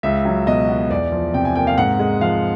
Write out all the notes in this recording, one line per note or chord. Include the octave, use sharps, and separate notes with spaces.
C#2 E5
F#3
B2 D#5
B3
E2 D5
F3
C3 G5
G#5
A#3 G5
F5
G#2 F#5
G#3
F3 F5